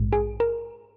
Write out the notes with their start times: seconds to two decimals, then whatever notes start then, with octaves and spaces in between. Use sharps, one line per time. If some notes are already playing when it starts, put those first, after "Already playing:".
Already playing: A#1 G#2 G#3
0.13 G#4
0.40 A#4